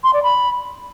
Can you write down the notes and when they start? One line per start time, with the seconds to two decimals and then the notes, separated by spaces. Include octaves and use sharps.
0.04 C6
0.13 D5
0.23 B5